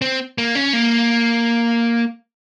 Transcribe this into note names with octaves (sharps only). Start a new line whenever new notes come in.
C4
A#3
C#4
A#3